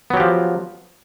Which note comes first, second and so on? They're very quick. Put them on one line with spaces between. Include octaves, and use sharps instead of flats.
B3 F#3 G4 F3